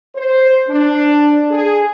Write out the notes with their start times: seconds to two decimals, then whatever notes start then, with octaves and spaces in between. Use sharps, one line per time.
0.15 C5
0.68 D4
1.51 G#4